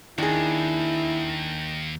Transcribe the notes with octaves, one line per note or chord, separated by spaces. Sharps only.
D#2 D#3 D4 E4 G#4